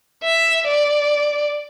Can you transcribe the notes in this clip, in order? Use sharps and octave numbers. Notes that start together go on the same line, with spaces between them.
E5
D5